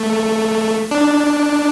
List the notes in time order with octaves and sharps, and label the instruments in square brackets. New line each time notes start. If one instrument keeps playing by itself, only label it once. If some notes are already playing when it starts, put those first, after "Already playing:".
Already playing: [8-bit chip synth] A3
D4